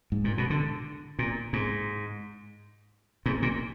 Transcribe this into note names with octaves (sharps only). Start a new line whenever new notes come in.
G#2
A#2
B2
D3
A#2
G#2
G#2
A#2